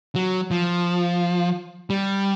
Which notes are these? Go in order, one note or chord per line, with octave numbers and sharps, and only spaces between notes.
F#3
F3
G3